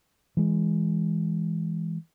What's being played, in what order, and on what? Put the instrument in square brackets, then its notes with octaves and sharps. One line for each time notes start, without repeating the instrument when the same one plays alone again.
[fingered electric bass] E3 G#3